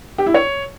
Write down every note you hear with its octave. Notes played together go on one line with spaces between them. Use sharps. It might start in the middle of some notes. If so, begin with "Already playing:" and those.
G4
E4
C#5